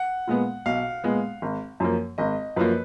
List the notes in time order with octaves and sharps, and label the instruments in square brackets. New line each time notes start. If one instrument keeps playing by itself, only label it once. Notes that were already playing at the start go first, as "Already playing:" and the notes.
Already playing: [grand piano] F#5
[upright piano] A#2 G#3 B3
[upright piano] B1 [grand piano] F5
[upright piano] A#2 G#3 B3
G#1
F#2 F3 A#3
[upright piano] G#1 [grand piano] D#5
[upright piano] F#2 F3 A#3 [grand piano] B4